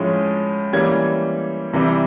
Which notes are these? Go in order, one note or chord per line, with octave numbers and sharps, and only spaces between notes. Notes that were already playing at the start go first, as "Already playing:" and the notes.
Already playing: A2 F3 G#3 C#4
E3 G3 A#3 C#4 G#6
C3 E3 G3